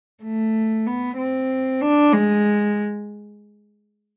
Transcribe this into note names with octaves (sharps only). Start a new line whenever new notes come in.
A3
B3
C4
D4
G#3